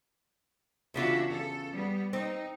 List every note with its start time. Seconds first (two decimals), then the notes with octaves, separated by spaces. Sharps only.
0.94 E2 C#3 D4 F4 F#4 E5
1.30 A4
1.73 G3 B3
2.13 C4 D#4